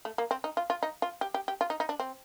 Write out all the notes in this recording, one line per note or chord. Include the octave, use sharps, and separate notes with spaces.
A3
A#3
C4
D#4
F4
F4
D#4
F4
G4
G4
G4
F4
D#4
D#4
D4
C4